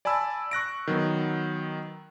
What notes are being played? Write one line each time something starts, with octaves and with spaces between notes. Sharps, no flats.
D5 G#5 A5 B5 E6
C#6 F#6 A#6 D7
D#3 F#3 B3